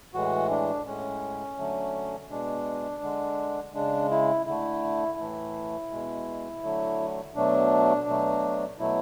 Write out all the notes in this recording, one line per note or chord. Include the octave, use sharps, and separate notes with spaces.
A2 E3 G#3 F#4
D4
A2 G#3 C#4
D3 F#3 A3
B2 G#3 D4
D3 G#3
C#3 G#3 D4
E4
D3 A3 E4
A2 E3 A3
B2 G#3
D3 F#3 A3
B2 F#3 A3 D4
B2 F#3 A3
B2 F#3 A3 E4